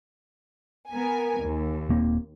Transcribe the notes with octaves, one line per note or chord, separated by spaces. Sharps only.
B3 A#4 G#5
D#2
D#1 A#3 C4